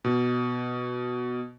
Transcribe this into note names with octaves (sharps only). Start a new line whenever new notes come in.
B2